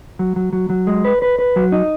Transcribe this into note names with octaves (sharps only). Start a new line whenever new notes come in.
F#3
F#3
F#3
F#3
G#3
B4
B4
B4
F#3
D#4